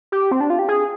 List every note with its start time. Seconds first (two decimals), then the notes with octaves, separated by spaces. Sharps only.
0.12 G4
0.31 C4
0.41 D4
0.50 F4
0.59 G4
0.69 G#4